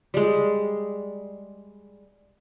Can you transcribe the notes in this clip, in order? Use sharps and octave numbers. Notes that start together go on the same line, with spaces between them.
G3 G#3